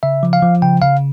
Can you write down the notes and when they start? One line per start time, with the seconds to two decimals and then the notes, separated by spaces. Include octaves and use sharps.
0.03 C#3 E5
0.23 F3
0.33 F5
0.42 F3
0.62 C#3 G5
0.82 C#3 F5